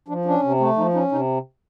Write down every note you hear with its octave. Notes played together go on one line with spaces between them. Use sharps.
F3 D4
C#4 D4
C3
A3
F3 D#4
C#4 D#4
C3 D#4